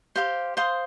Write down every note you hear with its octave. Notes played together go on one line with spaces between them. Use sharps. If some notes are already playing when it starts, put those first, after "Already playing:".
G4 C5 F5 C6
C5 F5 C6 D#6